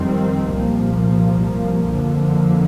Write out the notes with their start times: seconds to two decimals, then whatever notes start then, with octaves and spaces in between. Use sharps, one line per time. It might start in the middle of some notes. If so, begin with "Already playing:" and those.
Already playing: F2 D#3 G3 C4
0.52 C2 A#2 F3 A#3
1.89 F2 D3 F3 A#3